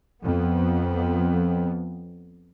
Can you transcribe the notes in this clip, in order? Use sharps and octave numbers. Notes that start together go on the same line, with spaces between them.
F2 B3